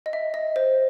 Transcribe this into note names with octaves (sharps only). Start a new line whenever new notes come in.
D#5
E5
D#5
C5